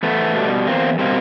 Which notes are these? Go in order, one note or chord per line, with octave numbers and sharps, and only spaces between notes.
E2 A3 B3
B2 G3
E2 A#3 C4
B2 G3 A#3 C4